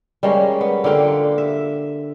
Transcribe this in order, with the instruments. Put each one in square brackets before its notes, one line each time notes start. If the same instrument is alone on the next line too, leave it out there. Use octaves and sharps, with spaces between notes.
[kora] G3 G#3 A#3 C#4
B3
D3 A#3 F4 G4
E5